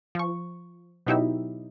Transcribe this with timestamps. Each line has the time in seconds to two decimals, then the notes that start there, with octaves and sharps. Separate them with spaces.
0.15 F3 C#6
1.07 B2 F#3 D#4 E4 G4 E5